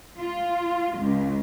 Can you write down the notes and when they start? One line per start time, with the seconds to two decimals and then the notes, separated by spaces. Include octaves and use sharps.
0.19 F4
0.99 C#2